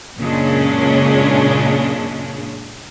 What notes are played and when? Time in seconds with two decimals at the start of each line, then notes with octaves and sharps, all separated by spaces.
0.19 F#2 A#2 C#3 G#3 C#4 D4